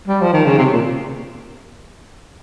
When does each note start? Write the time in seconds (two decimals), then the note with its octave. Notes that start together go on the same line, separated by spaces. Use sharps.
0.08 G3
0.21 F3
0.33 D#3
0.46 C#3
0.58 C3
0.73 A#2